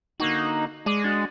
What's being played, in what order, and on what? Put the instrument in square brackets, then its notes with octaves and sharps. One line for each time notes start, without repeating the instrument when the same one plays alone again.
[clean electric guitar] D3 A#3 F#4 [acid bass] D#4
[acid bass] G#3 [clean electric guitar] G#4 D5
[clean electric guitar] D4 F#4